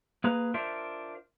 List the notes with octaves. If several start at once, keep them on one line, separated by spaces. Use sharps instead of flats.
A#3 G#4 B4 A#5
D4 F4 A#4 C5 E5